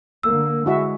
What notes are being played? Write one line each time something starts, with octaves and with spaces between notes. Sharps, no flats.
D3 A#3 E6
G#3 E4 F#4 E5